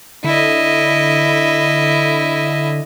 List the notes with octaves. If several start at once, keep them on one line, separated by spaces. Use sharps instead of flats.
D3 E4 D#5